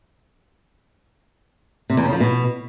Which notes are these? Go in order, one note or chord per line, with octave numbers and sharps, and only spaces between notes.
C3
E2
C#3
F3
B2